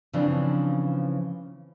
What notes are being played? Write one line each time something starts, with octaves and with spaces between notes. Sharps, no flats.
C#3 E3 F3 C4 D4